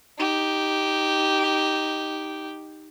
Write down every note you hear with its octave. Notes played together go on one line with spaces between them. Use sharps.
D#4 G4